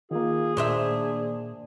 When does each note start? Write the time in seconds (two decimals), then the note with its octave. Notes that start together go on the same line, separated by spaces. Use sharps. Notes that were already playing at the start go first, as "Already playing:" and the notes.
0.11 D#3 A#3 F4 G#4
0.57 A#2 D4 C5 E5